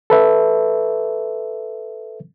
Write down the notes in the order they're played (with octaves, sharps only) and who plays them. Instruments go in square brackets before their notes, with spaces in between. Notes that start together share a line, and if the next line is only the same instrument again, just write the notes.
[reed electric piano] A4 B4 E5